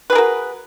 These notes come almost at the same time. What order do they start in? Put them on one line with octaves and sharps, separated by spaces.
B4 G#4 A#4 F#4